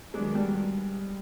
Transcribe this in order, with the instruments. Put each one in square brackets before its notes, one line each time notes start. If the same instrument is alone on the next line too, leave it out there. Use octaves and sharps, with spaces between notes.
[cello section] D#3 F#3 B3 D4 [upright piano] G#3
[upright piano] G3